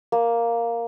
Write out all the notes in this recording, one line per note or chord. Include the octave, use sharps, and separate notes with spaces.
A#3